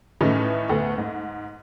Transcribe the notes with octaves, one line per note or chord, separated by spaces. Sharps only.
A2 D#3 E3 A3 C#4 D#4
D2 A3 B3
G#2